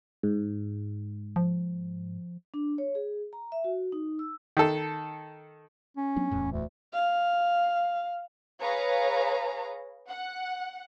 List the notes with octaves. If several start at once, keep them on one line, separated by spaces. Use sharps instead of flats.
G#2
F3
D4
C#5
G#4
A#5
E5
F#4
D#4
E6
D#3 A4
C#4
F#3 B3 D4
D1 E2 A2
D2
F5
G#4 B4 C#5 F5 A#5
F#5